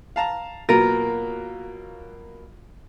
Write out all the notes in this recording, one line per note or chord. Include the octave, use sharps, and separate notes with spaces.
F5 A5 A#5
B2 F#3 A#3 F4 A#4